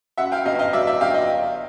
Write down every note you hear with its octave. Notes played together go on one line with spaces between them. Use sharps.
F#2 E5 F#5
F5 G5
G1 D#5 F5
D#5 F5
F#3 D5 E5
D5 E5
G1 F5 G5
D#5